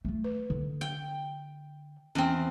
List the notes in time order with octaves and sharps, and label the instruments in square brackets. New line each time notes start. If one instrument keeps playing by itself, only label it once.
[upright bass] A3 F4
[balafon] B4
[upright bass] D3
[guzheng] G5
[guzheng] E2 C4 [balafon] C#4 G5